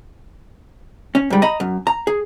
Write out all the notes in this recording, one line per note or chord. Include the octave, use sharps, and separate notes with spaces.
C#4
G#2 G3
D#5 A#5 B5
F#2
A#5
G#4